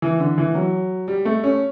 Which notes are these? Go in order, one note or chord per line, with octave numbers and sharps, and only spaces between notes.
E3
D3
E3
F#3
G3
A3
C#4